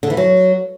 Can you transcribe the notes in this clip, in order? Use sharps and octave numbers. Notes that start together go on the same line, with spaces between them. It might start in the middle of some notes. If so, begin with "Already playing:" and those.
D3
E3
F#3